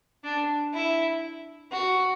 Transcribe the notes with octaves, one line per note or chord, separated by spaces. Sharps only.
D4
E4
F#4